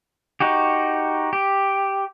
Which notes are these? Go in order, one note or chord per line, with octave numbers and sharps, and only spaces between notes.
D#4 F#4 G4
G4